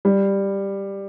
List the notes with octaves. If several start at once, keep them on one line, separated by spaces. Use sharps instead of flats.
G3